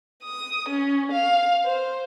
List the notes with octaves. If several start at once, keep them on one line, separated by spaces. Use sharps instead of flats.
D#6
C#4
F5
C5